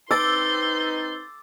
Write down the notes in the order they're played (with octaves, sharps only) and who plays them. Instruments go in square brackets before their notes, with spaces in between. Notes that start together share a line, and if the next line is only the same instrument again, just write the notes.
[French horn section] C4 D#4 B4 [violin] C6 G6 [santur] D6 [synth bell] E6 A6